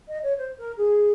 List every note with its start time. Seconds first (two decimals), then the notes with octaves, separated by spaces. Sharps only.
0.08 D#5
0.23 C#5
0.38 C5
0.58 A#4
0.77 G#4